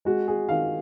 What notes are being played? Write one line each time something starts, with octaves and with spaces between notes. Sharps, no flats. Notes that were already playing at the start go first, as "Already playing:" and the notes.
G#3 F#4
G#4
D#3 F5